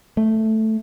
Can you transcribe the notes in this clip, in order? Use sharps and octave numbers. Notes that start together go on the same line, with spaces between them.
A3